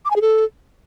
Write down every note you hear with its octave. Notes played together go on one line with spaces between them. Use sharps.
D6
G#5
G#4
A4